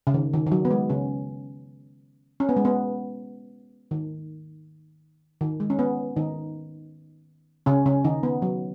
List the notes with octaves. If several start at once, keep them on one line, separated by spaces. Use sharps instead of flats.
C#3
D#3
D#3
D#3
F#3
B3
G#3
C#3 C#4
C#4
B3
G#3
B3
D#3
D#3
G#3
C#4
B3
D#3 D#4
C#3 C#4
C#3 C#4
D#3 D#4
B3
F#3